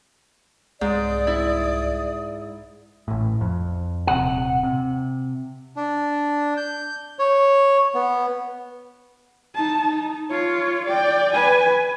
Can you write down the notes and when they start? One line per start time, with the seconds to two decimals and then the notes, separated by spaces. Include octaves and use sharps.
0.81 C2 G#2 D5 D#6
1.27 E4
3.08 A1 A2
3.41 F2
4.07 D#1 C3 F#5
4.63 C3
5.77 D4
6.57 G6
7.19 C#5
7.95 B3
9.55 D#4 A5
9.87 D#4
10.31 F4 C#5
10.85 D5 G5
11.32 B4 G#5